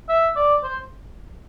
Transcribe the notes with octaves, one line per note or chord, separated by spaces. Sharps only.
E5
D5
C5